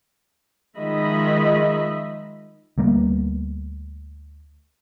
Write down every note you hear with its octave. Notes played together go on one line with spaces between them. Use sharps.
D#3 F3 G#3 D#5 E5 B5
D2 G3 A#3 B3